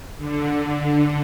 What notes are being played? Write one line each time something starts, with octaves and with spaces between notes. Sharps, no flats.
D3